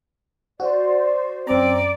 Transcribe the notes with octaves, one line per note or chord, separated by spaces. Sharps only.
F#4 C5 D5
F#2 C4 D5 A#5